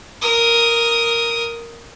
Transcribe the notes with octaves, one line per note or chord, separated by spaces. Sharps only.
A#4 D#6